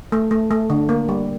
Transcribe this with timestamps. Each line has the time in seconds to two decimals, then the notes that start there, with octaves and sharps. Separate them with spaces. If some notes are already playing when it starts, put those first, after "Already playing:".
0.12 A3
0.31 A3
0.51 A3
0.70 D3
0.89 A#3
1.09 G3